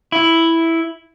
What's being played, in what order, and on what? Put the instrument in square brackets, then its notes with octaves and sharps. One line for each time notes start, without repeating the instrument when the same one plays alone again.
[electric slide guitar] E4